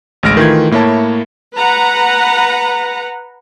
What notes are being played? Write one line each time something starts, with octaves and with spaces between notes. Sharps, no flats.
A1 D2 G#3 F6 A#6 D7
D#3 E3 A3 F4 G#6
A2 A#3 E4 C#5 A5
B4 F#5 A#5